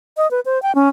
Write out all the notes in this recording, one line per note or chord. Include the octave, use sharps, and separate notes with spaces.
D#5
B4
C5
G5
C#4